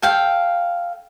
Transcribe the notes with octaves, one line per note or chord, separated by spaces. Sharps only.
A4 F5 G5